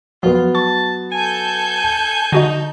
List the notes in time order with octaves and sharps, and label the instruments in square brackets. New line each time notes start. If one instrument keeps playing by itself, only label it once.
[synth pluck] F3 [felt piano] F#3 B3 [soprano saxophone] F4
[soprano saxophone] A5 [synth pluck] C#6
[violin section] A4 G6 [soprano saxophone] G#5
[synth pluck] D3 F#4 D#5 [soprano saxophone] D#4